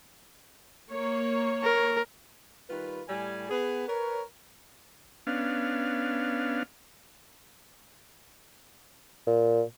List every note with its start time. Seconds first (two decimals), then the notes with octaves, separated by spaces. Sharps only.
0.89 A#3 C#5
1.63 A#4
2.69 D#3 G3 F4 B4
3.08 A2 G3 G#5
3.50 B3 G#4 B4
3.87 A#4 B4 C#5
5.27 B3 C#4 D4 F5
9.27 A#2